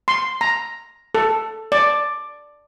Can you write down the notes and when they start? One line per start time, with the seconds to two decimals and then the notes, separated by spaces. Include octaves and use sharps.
0.08 C6
0.41 A#5
1.15 A4
1.72 D5